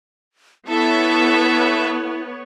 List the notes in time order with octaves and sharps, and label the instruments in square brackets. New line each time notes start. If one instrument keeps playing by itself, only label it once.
[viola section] B3 C#5 [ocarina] E4 [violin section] A4 E5